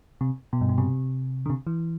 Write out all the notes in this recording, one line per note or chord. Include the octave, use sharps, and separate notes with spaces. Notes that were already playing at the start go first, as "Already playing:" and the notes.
C3
B2
G2
B2
C3
D3
C3
E3